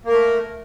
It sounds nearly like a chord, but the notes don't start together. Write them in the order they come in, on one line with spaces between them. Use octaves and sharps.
A#3 A#4 A3